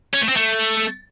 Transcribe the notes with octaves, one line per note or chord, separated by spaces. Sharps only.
C#4
A3
C4
A3